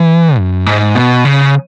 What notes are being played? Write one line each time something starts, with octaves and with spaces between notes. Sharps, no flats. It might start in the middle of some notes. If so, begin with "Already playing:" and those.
Already playing: E3
F#2
G#2
B2
C#3